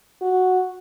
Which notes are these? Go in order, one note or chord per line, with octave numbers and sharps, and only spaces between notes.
F#4